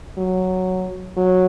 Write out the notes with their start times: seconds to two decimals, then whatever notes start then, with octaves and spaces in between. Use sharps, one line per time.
0.17 F#3
1.17 F#3